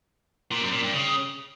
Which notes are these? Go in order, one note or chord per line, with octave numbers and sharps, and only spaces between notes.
A#2
F#2
A#2
G2
C#3